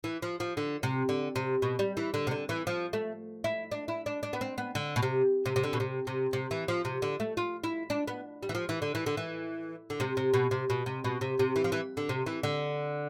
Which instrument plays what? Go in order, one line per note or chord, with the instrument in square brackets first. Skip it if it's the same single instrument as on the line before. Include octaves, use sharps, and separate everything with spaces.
[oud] E3
F3
F3
D3
C3
D3
C3
B2
G3
E3
D3
C3
D3
E3
F3
A3
E4
D4
E4
D4
D4
B3
C4
B3
D3
B2
C3
C3
C3
D3
B2
C3
C3
C3
E3
F3
C3
D3
A3
F4
E4
D4
B3
G3
E3
F3
E3
D3
E3
D3
E3
D3
C3
C3
B2
C3
B2
C3
B2
C3
C3
E3
F3
E3
D3
C3
E3
D3